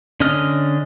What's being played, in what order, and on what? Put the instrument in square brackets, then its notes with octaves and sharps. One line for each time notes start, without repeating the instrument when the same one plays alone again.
[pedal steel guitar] D3 C#4 D4 D#5 F6